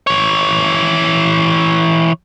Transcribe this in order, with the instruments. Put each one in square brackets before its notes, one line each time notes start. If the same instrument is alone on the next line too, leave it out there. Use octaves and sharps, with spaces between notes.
[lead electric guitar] E3 C#5